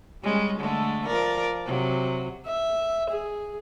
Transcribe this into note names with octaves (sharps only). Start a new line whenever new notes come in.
G3 G#3 C#4
D3 G#3 A3
F3 A#4 D5
C3 F#3
E5
G#4